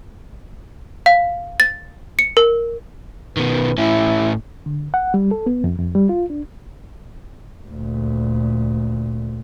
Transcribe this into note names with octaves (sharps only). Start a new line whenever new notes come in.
F5
A6
C#7
A#4
B2 D#3 B4
A2 C#4 E4
D3
F#5
G3
A4
B3
F2
F2
G3
F4
D4
D2 A#2